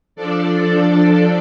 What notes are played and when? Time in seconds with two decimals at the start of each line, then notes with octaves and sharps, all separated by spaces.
0.16 F3 D4 A4 D5